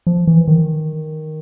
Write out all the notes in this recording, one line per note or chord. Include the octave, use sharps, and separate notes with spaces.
F3
E3
D#3